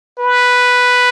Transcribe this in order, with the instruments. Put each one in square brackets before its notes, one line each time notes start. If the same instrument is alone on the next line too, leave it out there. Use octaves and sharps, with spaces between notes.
[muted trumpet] B4